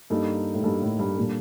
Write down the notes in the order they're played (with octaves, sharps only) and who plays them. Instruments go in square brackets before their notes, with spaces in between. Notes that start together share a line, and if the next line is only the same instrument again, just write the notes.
[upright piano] G2 [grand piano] A#3 D#4 A4
[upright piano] A2
[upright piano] G2 [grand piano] A#3 D#4 A4
[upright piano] A2
G2
[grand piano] A#2 G3 A#3 D4 A4